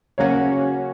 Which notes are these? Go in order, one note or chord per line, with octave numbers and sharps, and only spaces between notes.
C#3 F#3 A#3 C#4 F#4 C#5 F5